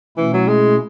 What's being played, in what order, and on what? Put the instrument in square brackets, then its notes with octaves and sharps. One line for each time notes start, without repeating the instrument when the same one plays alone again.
[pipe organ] B2 A3 C#4 E4 [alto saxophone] E3
[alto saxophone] F#3
G#3